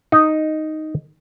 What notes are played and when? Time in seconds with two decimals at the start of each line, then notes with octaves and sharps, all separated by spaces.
0.12 D#4